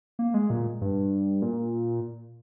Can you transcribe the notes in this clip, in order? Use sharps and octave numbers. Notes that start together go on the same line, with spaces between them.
A#3
G#3
A#2
G2
A#2